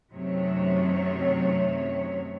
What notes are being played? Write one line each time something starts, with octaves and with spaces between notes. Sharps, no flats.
F#2 C3 D#3 F#3 A3 C#5